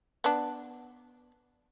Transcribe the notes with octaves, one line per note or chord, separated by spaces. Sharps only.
B3 D4